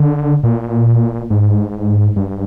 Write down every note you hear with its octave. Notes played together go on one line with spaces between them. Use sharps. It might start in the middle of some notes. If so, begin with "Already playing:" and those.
Already playing: D3
A#2
G#2
G2